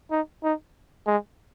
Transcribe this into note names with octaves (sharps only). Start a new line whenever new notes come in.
D#4
D#4
G#3